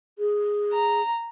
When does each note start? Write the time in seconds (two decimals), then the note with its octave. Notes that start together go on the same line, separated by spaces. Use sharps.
0.19 G#4
0.72 A#5